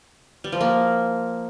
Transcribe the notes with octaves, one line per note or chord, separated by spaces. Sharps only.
G3
F3
A#3